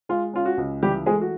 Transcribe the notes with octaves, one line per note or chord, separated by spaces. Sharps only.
G#3 F4
C#4 F4
F#4
C#2
E3 G3 G4
G#3 A3 G#4
F#4